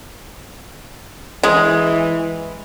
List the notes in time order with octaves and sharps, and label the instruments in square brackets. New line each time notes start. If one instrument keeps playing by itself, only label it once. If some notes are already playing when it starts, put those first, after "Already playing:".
[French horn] E3 [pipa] G#3